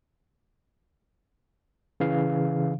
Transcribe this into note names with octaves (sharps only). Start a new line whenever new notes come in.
C#3 E3 F5